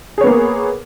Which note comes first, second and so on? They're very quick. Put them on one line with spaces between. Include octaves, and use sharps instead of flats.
G#4 C#5 B3 A#3